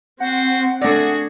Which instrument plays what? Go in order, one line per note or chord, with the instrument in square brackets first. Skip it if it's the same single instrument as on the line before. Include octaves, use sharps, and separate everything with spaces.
[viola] C4 [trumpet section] F#4 C5 [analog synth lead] F#5
[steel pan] A3 D5 [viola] D4 [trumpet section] F#4 G#4